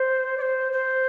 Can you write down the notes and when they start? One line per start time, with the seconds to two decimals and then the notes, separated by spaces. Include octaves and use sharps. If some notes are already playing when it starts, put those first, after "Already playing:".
Already playing: C5
0.38 D5
0.42 C5
0.72 C5